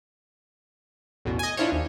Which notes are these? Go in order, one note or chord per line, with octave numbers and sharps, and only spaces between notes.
A1 E2 B2
D#5 G#5
D4 E4 F4 C5 C#5
D#2